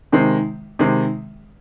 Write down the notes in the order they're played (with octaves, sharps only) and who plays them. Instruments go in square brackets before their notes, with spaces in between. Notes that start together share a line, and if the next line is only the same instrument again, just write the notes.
[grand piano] C3 D#3 G#3 C4
C3 D#3 G#3 C4